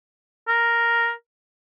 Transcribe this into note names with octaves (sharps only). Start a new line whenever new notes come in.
A#4